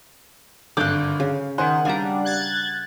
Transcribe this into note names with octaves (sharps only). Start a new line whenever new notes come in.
G#1 G2 D3 C6 D6 F#6 G6
C#3 F5
D#3 C5 F#5 G#5 C6
G3 D4 F5 G#5 A#5
F#6 G#6 A6